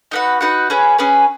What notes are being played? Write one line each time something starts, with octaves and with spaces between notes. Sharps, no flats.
D#4 F#4 B4 F#5
D#4 F#4 B4 F#5
C#4 G#4 B4
C#4 G#4 B4